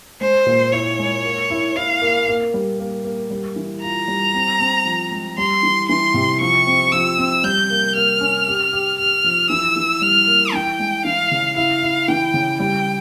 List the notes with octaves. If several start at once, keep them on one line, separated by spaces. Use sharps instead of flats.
G#3 C5
A#2
E4 C#5
G#3
A#3
E4
E4 F5
A#3
A#3
G3
A#3
A#3
G3
E3
F4 A#5
G3
C4
C4
F3
G#3
G3 C6
E3
E3 C6
C3
F3 C#6
C4
F3 E6
C4
G3 G6
A#3
A#3 F6
C#4
G4
G4
G4 F6
F3
E3 E6
E3
G3 F6
A#3
E3 G5
G#3
E3 F5
C#3
E4 F5
E4
E3 G5
C#3
G3 G5